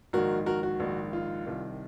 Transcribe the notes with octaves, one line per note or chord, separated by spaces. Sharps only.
A#1 G#2 D#3 F#4 A#4
F#4 A#4
F#4
A#1 G#2 D#3
F4
C2 C3 D#3